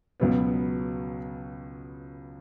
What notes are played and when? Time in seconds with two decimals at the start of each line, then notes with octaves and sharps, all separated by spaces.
0.20 C#2 B2 F#3 B3